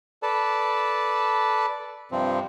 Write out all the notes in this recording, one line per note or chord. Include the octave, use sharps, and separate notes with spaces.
A4 B4 D5 A5
G2 C3 F3 C4